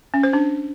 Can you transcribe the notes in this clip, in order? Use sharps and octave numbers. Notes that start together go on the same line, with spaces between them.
C#4
C5
D4